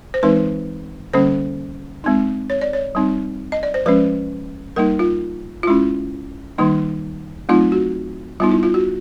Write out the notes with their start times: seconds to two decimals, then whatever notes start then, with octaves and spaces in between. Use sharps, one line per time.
0.14 C5
0.23 E3 G#3 C4 D#4 B4
1.14 D3 G3 A#3 C#4 C5
2.04 G#3 C4 D#4
2.50 C#5
2.61 D5
2.73 C#5
2.95 G3 C4 D#4
3.52 D#5
3.63 D5
3.74 C5
3.86 F3 G#3 C#4 B4
4.76 G3 A#3 D#4 A#4
4.99 F4
5.63 F4
5.67 G#3 C#4 E4
6.58 D#3 G3 A#3 D#4
7.49 F#3 A3 C4 D#4 F4
7.72 F#4
8.40 G3 B3 D#4 F4
8.52 E4
8.63 F4
8.74 F#4